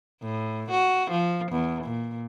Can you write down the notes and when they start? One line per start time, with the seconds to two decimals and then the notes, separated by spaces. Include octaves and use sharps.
0.22 A2
0.71 F#4
1.11 F3
1.52 E2
1.84 A#2